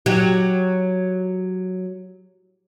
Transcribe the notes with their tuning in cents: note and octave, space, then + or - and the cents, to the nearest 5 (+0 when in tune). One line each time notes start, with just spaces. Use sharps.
F#3 +0 G4 +0